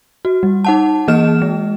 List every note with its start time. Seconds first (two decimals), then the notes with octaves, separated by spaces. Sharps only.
0.25 F#4
0.43 G3
0.65 D#4 F#5 A5
1.08 E3 A#3 G#4 D#5 F6 E7
1.42 G#3